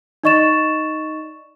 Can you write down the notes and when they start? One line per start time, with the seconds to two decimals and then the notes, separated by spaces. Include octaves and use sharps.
0.24 D#4 D5 D#5 C#6 A6 E7